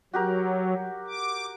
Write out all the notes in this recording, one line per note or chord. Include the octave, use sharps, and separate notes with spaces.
F#3 F#4 G4 A#4
D6